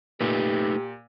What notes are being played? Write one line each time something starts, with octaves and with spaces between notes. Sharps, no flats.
A#2 A3 D#4 G4 B4